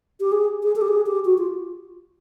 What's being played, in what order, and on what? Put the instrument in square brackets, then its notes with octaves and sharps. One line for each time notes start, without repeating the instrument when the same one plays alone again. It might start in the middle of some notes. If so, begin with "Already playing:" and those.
[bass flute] G4
G#4
G#4
A4
G4
G#4
G4
F#4
F4